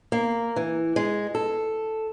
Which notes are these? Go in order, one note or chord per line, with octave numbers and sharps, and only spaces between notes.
A#3
E3
G#3
A4